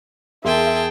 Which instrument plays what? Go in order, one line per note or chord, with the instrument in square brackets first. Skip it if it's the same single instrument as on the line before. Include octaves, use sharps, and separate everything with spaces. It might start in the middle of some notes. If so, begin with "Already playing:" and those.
[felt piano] E2 A#4 C6 [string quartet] G#4 G5 A5 [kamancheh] E5